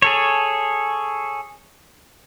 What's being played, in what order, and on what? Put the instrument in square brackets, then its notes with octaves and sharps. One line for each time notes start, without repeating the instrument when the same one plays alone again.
[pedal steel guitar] G#4 A4 C#5